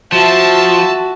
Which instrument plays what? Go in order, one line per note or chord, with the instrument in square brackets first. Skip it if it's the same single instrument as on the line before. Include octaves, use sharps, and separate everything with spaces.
[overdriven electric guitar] F3 [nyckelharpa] F#4 [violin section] E5 A5